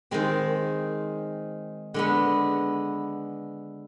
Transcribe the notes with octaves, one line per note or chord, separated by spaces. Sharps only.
D#3 G#3 C4
D3 G#3 B3